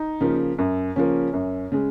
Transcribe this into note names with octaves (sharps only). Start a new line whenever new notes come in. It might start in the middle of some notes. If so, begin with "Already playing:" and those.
Already playing: D#4
C#3 F3 A#3
F#2
C#3 F3 A#3 C#4
F#2
C#3 G#3